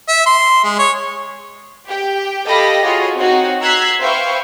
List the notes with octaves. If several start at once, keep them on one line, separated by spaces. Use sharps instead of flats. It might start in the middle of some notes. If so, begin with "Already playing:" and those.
E5
C6
G#3
C#5
G4 G5
G4 A4 D#5 F5 B5 A#6
F4 F#4 G#4 C#5 D#5
C4 D#4 F#4 C#5
A#5 E6 F#6 G#6 B6 C7
B4 C5 E5 F5 G5 C#6